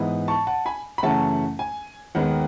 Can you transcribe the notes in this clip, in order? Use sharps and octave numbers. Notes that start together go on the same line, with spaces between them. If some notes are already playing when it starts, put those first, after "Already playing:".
Already playing: G#2 E3 B3
A5 C#6
F#5 A5
G#5 B5
B5
F#2 C#3 E3 A3 C#4 F#5 A5
G#5
D#2 D#3 G#3 B3 F#5